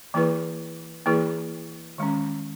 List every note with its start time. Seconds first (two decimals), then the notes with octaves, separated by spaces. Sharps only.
0.14 E3 A#3 E4 G#4 B4
1.06 E3 A#3 E4 G#4 B4
1.98 D#3 G#3 C#4